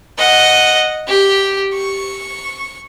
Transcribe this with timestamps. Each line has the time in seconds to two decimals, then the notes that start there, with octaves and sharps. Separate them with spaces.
0.18 D#5 F#5
1.07 G4
1.73 C#6